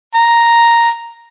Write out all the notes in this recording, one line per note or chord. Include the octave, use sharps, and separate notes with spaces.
A#5